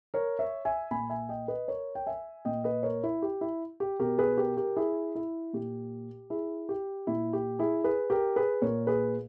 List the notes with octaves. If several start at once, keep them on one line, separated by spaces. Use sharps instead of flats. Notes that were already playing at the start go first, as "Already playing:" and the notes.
A#4 C#5
C#5 E5
E5 G#5
A#2 G#5 B5
E5 G#5
D#5 G5
B4 D#5
A#4 C#5
G5
E5 G#5
A#2 D#5 G5
B4 D#5
A#4 C#5
E4
G4
E4
G4
B2 G4 A#4
G#4 B4
G4 A#4
G4 A#4
E4 G#4
E4
A#2 G4
E4 G#4
G4
A#2 E4
G4
E4 G#4
G#4 B4
G4 A#4
G#4 B4
A#2 A#4 C#5
G#4 B4